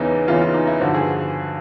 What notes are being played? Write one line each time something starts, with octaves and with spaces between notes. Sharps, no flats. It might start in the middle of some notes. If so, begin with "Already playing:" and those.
Already playing: E2 C#3 E3 D#4
E2 C#3 E3 F4
F4
D#4
E4
G2 D3 F3 F#4
G#4